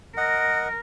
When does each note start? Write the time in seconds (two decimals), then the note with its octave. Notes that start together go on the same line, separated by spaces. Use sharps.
0.17 A#4 D#5 F#5